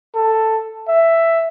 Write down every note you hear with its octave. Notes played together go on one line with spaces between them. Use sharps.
A4
E5